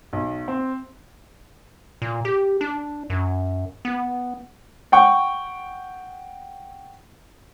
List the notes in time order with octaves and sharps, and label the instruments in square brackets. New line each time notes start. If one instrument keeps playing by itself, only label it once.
[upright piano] B1
C4
[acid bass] A#2
G4
D4
F#2
B3
[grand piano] F#5 G5 C#6